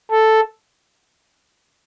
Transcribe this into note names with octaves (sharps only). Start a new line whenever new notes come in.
A4